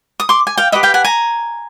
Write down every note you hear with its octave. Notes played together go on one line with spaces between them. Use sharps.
D#6
C6 D6
G#5
F5 G5
G4 B4 D#5 E5 F#5
F5 G5
F#5 G#5
G#5 A#5